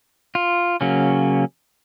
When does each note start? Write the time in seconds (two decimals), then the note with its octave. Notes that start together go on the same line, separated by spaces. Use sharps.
0.35 F4
0.81 C#3 F#3 A#3 C#4